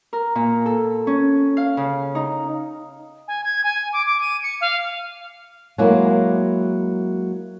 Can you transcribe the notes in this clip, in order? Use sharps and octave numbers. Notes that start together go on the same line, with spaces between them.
A#4
A#2
A4
C#4
F5
C#3
D#4
G#5
G#6
G#5
D6
D6
D#7
C#7
F5
F#3 G#3 A#3 E4